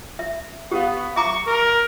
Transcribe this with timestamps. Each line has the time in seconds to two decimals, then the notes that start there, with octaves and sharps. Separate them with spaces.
0.19 E5
0.71 B3 G4 F5
1.16 E5 A#5 C#6 D6
1.47 A#4